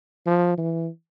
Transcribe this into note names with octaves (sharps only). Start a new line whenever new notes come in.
F3
E3